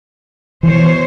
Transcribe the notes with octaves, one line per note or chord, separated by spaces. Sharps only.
B2 E3 C5 C#5